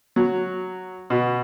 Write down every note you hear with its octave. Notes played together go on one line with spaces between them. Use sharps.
F#3
B2